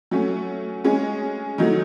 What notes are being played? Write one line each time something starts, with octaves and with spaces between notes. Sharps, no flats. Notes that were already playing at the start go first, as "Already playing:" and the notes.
F#3 A3 C#4
G#3 C#4 G#4
D#3 F#3 A3 D#4